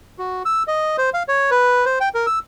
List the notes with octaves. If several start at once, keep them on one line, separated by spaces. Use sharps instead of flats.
F#4
E6
D#5
C5
F5
C#5
B4
C5
G5
A#4
E6